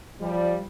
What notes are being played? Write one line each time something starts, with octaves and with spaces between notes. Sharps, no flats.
F3 G3